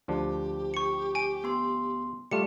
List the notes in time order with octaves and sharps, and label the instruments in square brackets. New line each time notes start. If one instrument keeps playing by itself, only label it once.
[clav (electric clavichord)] D2 F3 D4 [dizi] G4
[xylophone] C#6 C#7
G#5 D7
[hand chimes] B3 C6
[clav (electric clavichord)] G3 A3 F4 [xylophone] G4 C#7